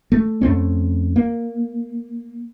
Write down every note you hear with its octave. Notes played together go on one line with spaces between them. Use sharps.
A3
F2 A3 C4 C#4
A#3